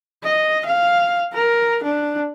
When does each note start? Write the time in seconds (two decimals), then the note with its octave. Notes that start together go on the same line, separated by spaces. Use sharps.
0.23 D#5
0.66 F5
1.33 A#4
1.83 D4